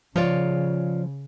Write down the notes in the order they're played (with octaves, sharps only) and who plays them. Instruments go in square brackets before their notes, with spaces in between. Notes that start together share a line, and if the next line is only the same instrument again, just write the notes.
[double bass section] C#3 [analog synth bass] F3 [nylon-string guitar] F4 C#5 D5